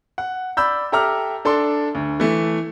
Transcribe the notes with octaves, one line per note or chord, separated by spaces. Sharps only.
F#5
D5 B5 E6 G6
G4 A4 E5 A#5 D6 F6
D4 A4 D5 C6
D2
E3 A3